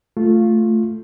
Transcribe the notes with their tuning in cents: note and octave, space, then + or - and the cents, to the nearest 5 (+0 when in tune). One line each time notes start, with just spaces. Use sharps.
A3 +0 F4 +0